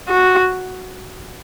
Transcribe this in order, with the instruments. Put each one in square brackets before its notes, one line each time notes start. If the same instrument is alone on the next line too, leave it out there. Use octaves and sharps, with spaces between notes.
[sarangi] F#4